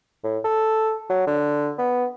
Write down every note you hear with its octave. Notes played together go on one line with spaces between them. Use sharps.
A2
A4
F#3
D3
B3